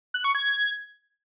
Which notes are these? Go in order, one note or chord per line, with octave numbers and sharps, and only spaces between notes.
F#6
C#6
G#6